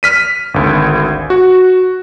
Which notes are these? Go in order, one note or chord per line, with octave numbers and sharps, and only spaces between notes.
F6 B6 D#7
G#1 D2
F#4